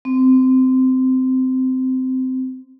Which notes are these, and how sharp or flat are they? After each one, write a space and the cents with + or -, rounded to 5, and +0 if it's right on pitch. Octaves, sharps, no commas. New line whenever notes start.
C4 -15